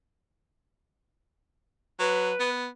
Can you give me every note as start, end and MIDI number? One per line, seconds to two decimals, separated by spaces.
2.00 2.31 54
2.00 2.49 71
2.40 2.67 59